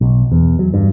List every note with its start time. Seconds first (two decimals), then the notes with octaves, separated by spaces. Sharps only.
0.01 B1
0.32 E2
0.59 F#3
0.74 G2